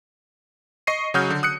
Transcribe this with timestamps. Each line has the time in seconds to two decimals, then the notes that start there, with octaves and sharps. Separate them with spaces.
0.87 D#5 C#6 A#6 C7 D#7
1.14 C#3 F#3 F#4 D#6 F6 G6
1.30 D3
1.43 D#6 F#6 C#7